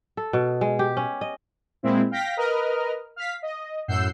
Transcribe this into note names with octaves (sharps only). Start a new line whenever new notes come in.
A4
B2
G#3
G4
C#4
D#5
A#2 G#3 C4 E4
F5 G5 A#6 B6
A#4 B4 D#5 F6
F5 B6
D#5
F#2 A2 F#5 E6 G6 C7